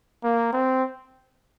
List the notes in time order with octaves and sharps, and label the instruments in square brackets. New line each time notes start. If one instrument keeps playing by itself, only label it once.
[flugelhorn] A#3
C4